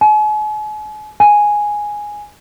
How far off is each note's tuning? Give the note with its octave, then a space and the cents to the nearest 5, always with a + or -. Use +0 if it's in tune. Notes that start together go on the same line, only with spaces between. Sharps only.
G#5 +40
G#5 +0